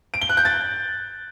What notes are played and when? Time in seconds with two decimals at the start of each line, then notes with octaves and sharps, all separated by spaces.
0.14 D7
0.21 G7
0.29 F#6
0.37 G6
0.45 A6